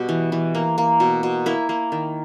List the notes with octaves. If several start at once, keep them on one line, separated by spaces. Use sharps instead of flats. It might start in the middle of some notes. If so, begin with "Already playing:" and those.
Already playing: B2 G3 G4
E3
E3
A#3
A#3
B2
B2
A#3 E4
A#3
D#3